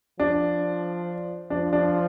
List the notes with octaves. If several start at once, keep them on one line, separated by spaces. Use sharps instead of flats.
F3 D4
F3 D4
D4